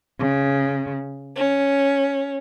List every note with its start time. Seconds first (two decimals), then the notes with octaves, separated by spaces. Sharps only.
0.20 C#3
1.36 C#4